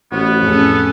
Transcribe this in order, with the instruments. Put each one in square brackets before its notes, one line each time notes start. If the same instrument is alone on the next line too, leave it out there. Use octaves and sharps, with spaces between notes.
[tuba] A1 [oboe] B3 [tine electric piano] F#4 C5 F6
[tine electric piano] F2 A2 [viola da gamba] C#4 G#4 A4